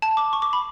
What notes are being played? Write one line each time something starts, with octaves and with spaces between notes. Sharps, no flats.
A5
D6
C#6
D6
B5